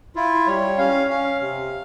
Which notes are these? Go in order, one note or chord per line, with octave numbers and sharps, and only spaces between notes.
E4 F4
G3 C#5
C#4 F5
C#4 F5
C3